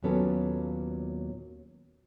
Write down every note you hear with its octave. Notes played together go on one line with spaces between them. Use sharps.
D#2 A#2 F#3 B3 C#4 A4